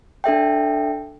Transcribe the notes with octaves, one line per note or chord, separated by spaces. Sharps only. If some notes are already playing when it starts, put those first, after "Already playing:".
D4 A4 E5 G5